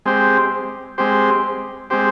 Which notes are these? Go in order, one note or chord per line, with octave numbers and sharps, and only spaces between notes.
G#3 C4 G4 C5
G#3 C4 G4 C5
G#3 C4 G4 C5